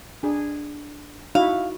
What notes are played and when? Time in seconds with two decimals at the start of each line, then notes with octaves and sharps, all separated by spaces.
0.23 D4 G#4
1.35 D#4 E4 F#4 F5